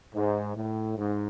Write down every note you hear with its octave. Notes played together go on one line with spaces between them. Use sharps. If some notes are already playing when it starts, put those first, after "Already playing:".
G#2
A2
G#2